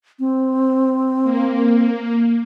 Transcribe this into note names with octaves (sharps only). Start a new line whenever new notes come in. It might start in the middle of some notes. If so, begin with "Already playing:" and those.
C4
A#3